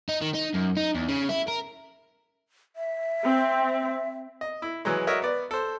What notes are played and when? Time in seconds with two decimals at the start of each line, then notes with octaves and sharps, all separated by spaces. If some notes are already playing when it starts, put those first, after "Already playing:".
0.09 D#4
0.21 D#3
0.34 D#4
0.54 F#2
0.77 D#4
0.95 E2
1.09 C#3
1.29 E4
1.48 A#4
2.76 E5
3.24 C4
4.41 D#5
4.62 E4
4.85 E3 F#3 G#3
5.07 F#4 A#4 C#5 D#5 E5
5.22 B3 D5
5.51 A4 C5